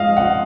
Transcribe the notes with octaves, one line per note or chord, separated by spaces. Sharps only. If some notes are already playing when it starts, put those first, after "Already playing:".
Already playing: G#2 F3 D#5 F5
F#5